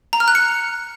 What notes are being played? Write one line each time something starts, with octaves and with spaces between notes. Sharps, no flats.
A#5
F6
F#6
C#7